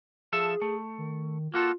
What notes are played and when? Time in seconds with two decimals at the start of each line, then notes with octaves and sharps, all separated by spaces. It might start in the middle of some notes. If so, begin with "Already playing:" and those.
0.33 F3 G#4 A4 E5
0.62 A3
0.98 D#3
1.54 A#3 F4 F#4 A4